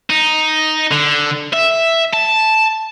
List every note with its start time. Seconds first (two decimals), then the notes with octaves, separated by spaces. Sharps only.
0.10 D#4
0.91 D3
1.53 E5
2.13 A5